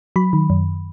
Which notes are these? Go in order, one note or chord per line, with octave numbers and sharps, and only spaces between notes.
F#3 B5
D#3
F#2